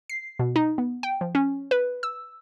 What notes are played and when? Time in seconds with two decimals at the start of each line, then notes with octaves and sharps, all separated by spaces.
0.10 C7
0.39 B2
0.56 D#4
0.78 B3
1.03 G5
1.21 F3
1.35 C#4
1.71 B4
2.03 E6